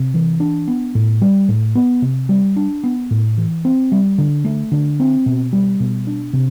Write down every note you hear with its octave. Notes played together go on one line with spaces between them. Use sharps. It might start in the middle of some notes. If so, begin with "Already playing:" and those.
Already playing: C3
E3
D4
B3
A2
G3
A2
B3
C3
G3
D4
B3
A2
E3
C4
G3
D3
A3
D3
C4
B2
G3
B2
D4
C3